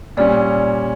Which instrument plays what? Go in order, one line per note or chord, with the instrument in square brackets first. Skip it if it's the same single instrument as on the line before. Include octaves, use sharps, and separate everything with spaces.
[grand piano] A#2 G3 C#4 [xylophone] D5